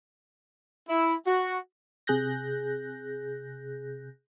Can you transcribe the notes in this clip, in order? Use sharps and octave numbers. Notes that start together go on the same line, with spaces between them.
E4
F#4
C3 G#4 F#6 G6 A#6